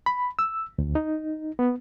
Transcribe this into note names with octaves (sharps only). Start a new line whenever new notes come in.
B5
E6
D2
D#4
B3